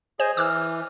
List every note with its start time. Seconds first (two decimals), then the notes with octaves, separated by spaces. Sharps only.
0.20 G#4 C5 D#5 G#5
0.37 E3 D6 E6 F6